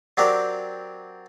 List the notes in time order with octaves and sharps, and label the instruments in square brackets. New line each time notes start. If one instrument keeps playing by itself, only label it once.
[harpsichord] F#3 C4 D4 G4 A#4 D5